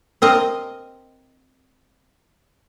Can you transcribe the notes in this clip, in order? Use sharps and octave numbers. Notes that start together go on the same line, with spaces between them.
C4 A#4 D#5